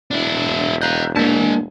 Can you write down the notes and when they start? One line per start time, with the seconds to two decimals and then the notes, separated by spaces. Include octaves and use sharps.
0.11 E1 D4 E4
0.82 D#5 F5 A#5 F#6 G6
1.16 G#3 A#3 D4 A5